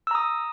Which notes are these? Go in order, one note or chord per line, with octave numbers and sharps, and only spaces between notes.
A#5 D#6 E6